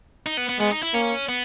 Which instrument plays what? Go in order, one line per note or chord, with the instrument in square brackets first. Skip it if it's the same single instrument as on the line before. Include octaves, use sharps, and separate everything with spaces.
[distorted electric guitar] D#4
B3
B3
[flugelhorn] G#3 [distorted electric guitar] B3
[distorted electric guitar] D#4
E4
[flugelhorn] A#3 [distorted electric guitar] C#4
[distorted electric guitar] B3